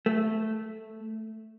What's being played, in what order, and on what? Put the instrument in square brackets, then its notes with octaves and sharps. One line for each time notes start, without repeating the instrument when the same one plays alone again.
[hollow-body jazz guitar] A3